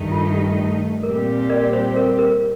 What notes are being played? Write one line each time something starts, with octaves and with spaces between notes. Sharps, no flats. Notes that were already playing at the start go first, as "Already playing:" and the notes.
Already playing: G2 D#3 A3 D#4
F4
G4
A#2 G3 C4 G4 A#4
A#4 D5
C5
A#4
A#4